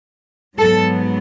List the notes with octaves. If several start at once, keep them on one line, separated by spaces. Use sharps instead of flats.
G#2 F#3 B3 A4